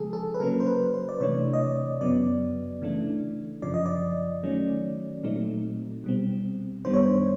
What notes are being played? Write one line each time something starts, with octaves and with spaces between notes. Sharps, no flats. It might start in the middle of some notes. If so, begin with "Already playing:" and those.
Already playing: C#3 F3 G#3 G#4 A4
A4
B4
C#3 F#3 A#3 C#4 A#4
C5
B4
C5
D5
C3 E3 A3 D4 C#5
D#5
D5
F#2 C#3 F#3 B3 D5
C#3 E3 A3 D4
F#2 C#3 F3 D5
D#5
D5
D#3 F#3 A3 C#4
A#2 F#3 A3 C4 D#4
B2 G3 C4
F#2 D#3 G3 B3 D4 C5
C#5
C5